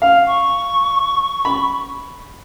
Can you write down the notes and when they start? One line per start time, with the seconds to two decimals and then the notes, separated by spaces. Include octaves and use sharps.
0.02 F5
0.27 C#6
1.45 B5